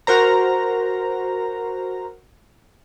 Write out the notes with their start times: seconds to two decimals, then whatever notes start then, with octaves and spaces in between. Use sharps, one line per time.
0.07 F#4 A#4 C5 A#5